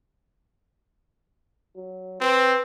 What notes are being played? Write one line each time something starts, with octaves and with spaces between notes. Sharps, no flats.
F#3
C4 B4